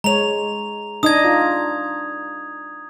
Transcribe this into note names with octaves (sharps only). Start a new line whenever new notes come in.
G#3 C#5 A#5 F7
D4 D#4 D#5 D#6 G#6
F4